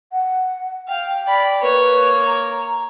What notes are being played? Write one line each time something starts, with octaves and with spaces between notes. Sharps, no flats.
F#5
F5 G5
D5 B5
A#3 B4 C#5
A#5